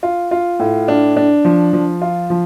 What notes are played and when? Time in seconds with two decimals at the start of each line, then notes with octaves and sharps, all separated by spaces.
0.03 F4
0.31 F4
0.59 A2
0.88 D4
1.17 D4
1.45 F3
1.73 F3
2.02 F4
2.30 F3